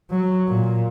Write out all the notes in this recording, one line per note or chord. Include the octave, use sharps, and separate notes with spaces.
F#3
A#2